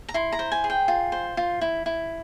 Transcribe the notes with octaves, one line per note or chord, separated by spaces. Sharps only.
A#5
E4 C6
A#5
C5
G#5
G#4
G5
F4
C5
F4
E4
E4